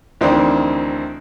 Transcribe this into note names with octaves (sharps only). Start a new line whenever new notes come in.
D2 D#3 E3 C4 D4 G5